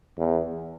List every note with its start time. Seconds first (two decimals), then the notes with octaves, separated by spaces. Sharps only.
0.18 E2